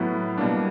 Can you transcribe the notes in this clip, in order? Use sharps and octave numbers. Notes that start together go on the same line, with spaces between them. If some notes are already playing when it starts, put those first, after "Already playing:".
Already playing: A2 F#3 B3 E4
B2 G3 A#3 D4